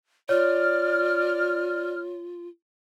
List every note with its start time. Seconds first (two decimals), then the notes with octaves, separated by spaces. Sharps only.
0.29 F4 C#5 D5 F6